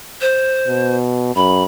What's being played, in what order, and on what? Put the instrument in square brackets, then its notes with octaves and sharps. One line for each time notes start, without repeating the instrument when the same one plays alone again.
[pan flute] C5
[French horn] B2
[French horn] F#2 [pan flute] B5